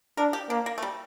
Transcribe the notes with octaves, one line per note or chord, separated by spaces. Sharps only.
D4 A#4
G4
A#3 D4
A#3
A3
G3